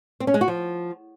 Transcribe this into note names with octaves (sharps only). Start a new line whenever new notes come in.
C4
C#4
G#3
F#4
F3